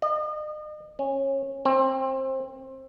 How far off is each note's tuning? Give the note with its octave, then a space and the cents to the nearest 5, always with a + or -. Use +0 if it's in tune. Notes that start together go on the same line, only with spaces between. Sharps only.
D#5 -40
C#4 -25
C4 +25